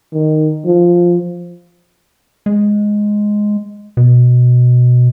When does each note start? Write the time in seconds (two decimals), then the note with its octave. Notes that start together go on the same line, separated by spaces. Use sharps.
0.13 D#3
0.66 F3
2.46 G#3
3.97 B2